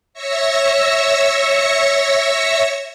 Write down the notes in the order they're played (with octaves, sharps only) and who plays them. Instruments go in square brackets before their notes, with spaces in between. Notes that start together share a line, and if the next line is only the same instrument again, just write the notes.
[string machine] C#5 E5 E6 A#6 C#7